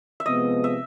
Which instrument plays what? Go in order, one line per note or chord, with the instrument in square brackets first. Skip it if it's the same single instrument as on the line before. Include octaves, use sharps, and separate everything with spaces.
[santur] E5
[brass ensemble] C3 F3 G#3 B3 [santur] D#5
[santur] E5